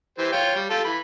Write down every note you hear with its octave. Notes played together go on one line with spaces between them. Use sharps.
E3 G4 C5
F4 C#5 G5
G3
F4 G4 A4
E3 B5